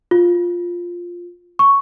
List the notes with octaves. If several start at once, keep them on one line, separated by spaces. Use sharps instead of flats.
F4
C#6